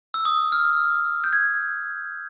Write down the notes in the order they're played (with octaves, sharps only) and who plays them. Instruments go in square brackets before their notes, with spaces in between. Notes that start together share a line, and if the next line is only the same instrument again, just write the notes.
[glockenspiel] E6
D#6
F6
G6
G#6